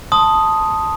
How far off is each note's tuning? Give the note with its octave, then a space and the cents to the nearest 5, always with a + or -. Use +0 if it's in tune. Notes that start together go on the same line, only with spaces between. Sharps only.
A5 +0 C6 +0 D#6 +0